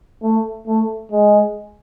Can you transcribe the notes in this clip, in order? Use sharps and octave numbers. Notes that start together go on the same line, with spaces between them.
A3
A3
G#3